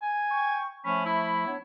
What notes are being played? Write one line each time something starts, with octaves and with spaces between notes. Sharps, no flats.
G#5
G5 C#6
F3 A3 C#4 B5
E4
B3 D4 C#5